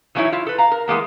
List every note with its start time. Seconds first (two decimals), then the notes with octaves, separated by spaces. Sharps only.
0.15 E3 F#3 A#3 D#4 E4 C#5
0.32 E4 F4
0.47 A4 B4
0.58 F5 A#5
0.72 A#4
0.88 E3 G#3 A#3 B3